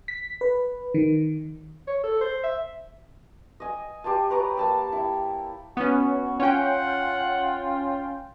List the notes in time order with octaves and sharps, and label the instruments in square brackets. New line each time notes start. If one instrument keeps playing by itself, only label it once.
[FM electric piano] B6
B4
D#3
[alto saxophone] C#5
A4
C5
E5
[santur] D#5 G#5
G4 C5 G#5 A5
B4 C#5 A#5 D6
A#3 A5 E6
E4 E5
[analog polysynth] B3 C#4 [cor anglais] F#4
[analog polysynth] C#4 G5 [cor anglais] F4 [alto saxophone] F#5